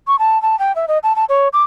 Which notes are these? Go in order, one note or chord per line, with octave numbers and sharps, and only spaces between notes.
C#6
A5
A5
G5
E5
D#5
A5
A5
C#5
D6